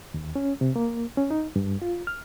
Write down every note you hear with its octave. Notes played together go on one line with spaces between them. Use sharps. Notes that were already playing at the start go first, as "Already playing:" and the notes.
D#2
C#4
C3
A#3
C#4
D#4
G2
F4
F6